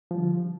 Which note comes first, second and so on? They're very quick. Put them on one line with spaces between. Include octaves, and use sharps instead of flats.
F3 G3 D3